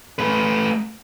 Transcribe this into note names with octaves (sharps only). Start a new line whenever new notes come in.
A3 B4